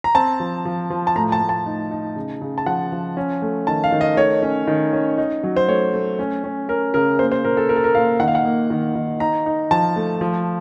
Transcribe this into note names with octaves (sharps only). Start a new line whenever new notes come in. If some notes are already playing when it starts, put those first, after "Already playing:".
A#5
C4 A5
F3
F3
F3
A5
A2 A#5
A5
A2
A5
D#4
D#4
C#3
C#3
A5
F3 F#5
F3
C#4
A3
D#3 A5
F5
D#3
D#5
A3 C#5
C#4
D#3
C#4
D#4
F#3
C5
A3 C#5
A3
C#4
C#4
C#4 A#4
C#3 A#4
A#3 C5
C5
A#2 A#4
A4
A#3 A#4
A4
A#4
A#2 F5
D#3 F#5
F5
F#5
A#3
D#3
D#3
D#4 A#5
D#4
F3 A5
A3
F3